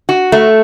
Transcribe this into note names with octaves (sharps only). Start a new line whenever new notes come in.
F#4
A3